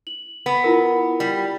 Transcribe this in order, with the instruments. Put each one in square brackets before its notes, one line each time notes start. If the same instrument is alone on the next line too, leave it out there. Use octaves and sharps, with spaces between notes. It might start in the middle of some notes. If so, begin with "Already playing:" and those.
[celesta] F#7
[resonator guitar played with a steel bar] B3
[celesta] E4 F4 A#4
[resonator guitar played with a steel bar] G3